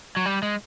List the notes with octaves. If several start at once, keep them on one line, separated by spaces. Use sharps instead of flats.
F#3
G3
G#3